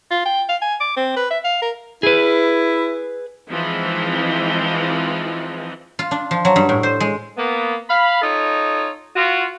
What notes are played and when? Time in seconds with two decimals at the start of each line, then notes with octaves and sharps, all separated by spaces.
0.11 F4
0.26 G5
0.49 F5
0.62 G#5
0.81 D6
0.97 C4
1.17 B4
1.31 E5
1.44 F5
1.62 A#4
2.03 E4 G#4 B4
3.50 E3 F3 G#3 C4 D#4
5.99 F4
6.11 D4
6.31 F3
6.45 F#3
6.56 G2
6.69 A2
6.83 C5
7.00 G#3
7.38 A#3 B3
7.90 F5 B5
8.22 D#4 F4 A4 C#5
9.16 F4 F#4